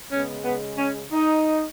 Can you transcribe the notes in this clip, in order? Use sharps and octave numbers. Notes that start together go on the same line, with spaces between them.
C#3 G#3 B3 C#4
B3
C#4
D#4